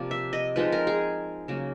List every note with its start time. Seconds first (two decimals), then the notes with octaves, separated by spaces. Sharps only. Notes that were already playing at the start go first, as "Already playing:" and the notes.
Already playing: C3 F3 A#3 D5
0.11 E5
0.33 D#5
0.56 F3 G#3 C4 D#4 B4
0.72 A#4
0.87 G#4
1.48 C#3 F#3 A#3